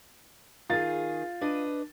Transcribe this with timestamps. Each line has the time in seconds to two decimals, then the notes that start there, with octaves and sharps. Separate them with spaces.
0.70 D#3 F4 G#4 A6
1.41 D4 B4 D#5